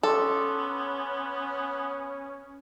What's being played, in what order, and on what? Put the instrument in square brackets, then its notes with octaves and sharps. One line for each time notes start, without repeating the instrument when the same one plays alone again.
[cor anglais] B3 [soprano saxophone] C#4 [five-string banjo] A4 [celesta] C6 D6